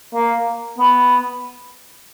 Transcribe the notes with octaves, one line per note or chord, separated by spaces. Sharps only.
A#3
B3